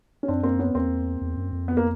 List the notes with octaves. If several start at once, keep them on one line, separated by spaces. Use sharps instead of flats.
C#4
F#2 C4 D4
A#3 C4
B3 C#4
E2 A#3 C4
E2
F#2
F2
B3
A#3